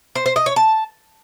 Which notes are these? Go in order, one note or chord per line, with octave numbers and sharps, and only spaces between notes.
C5
C5
D#5
C#5
A5